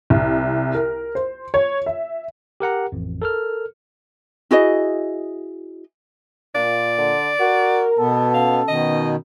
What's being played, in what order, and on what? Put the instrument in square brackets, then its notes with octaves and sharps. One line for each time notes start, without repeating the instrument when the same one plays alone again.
[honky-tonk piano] C2
A#4
C5
C#5
E5
[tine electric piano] G4 A#4 F#5 A#5
A1 F2
A4 A#4 F6
[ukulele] E4 F#4 G#4 D#5
[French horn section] A#2 [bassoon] A#3 [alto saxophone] D5
[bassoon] D3
[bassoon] F#4 [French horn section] A#4
[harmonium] B2 B3 [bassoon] A4
[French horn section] C#4 [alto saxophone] F5
[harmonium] B2 D#3 [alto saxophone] D#5